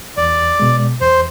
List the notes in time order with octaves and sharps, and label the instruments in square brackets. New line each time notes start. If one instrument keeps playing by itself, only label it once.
[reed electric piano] E2 [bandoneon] D5
[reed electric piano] B2 G#3
[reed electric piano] E2 [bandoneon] C5